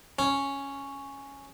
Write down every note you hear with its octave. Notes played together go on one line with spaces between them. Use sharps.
C#4